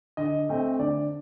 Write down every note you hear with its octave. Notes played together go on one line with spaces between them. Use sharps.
D3 D#5
A3 C4
D3 D5